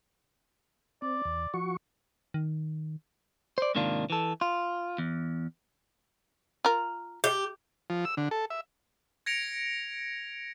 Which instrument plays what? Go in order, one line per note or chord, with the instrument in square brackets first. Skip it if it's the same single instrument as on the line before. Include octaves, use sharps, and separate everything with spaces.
[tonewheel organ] C4 [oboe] D5
[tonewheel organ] E2
F3 F#4 C#6
[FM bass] D#3
[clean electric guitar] C5 D5
G#2 C3 D#3 A#3 D4 F4
E3 A4
F4
E2
[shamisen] F4 A#4
[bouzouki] G4
[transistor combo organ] F3
E6
D3
A4
E5
[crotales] G#6 A#6 C#7 D7 F7